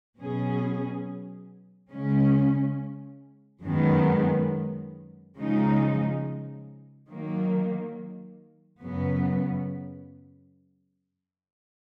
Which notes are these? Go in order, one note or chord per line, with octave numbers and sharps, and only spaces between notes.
B2 F#3 C#4 G#4
C#3 G#3 C#4
F#2 D#3 G#3 B3
C#3 F3 G#3 D#4
D#3 F#3 A#3
F#2 C#3 F#3 B3